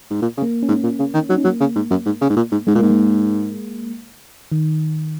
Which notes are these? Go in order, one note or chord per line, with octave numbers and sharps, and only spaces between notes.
G#2
A#2
C#3
A#3
C#4
G#2
A#2
C#3
D#3
F#3 D#4
C#4
F#3 A#3
C#3
G#2
F#2
G#2
C#3
G#2
A#2
G#2
G#2 G#3
A#2
G#2 A#3
G#3
D#3